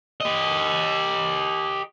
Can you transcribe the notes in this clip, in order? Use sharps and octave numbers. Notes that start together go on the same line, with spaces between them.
G4 D#5